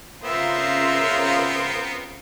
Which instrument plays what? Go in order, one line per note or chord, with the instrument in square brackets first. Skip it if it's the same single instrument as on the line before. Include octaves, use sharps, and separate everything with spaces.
[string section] C#3 F4 A#5 [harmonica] B3 C4 [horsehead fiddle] A#4 C5 [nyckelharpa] E5